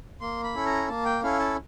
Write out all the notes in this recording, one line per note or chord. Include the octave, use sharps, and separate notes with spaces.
A#3 C6
B5
C#4 E4 A4
A#5
A#3 A5
G5
C#4 E4 A4 F5
A5